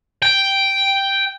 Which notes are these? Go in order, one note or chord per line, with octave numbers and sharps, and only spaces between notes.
G5